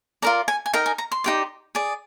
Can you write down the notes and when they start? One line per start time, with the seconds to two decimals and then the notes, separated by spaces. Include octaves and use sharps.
0.22 F4 A#4 D5 A#5
0.48 G#5
0.66 G#5
0.73 D#4 A#4 D#5 G5
0.86 G#5
0.98 A#5
1.12 C6
1.24 D#4 G4 D5
1.75 G#4 D5